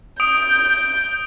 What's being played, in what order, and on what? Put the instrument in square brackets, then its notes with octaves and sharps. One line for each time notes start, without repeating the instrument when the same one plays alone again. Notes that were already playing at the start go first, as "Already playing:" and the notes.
[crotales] D#6 D7 [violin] G6